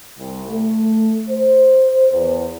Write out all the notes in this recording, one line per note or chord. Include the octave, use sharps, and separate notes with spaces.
C2
A3
C5
E2